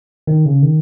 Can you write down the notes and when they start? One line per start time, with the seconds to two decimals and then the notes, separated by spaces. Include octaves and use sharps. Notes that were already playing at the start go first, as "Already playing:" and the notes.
0.27 D#3
0.45 C#3
0.62 D#3